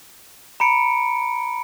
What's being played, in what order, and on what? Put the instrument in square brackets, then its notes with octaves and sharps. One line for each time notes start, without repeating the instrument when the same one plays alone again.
[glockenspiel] A#5 B5 C#7 D7